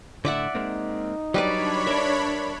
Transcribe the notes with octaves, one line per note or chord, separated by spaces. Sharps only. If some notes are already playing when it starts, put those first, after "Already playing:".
A2 D3 D5 E5 F#5
G#3 A#3 C4 D#4
F#3 G3 D4 B4 C#5 D5 B5
A#4 D5 E5